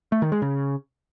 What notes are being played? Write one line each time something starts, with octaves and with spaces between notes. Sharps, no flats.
A3
D#3
G#3
C#3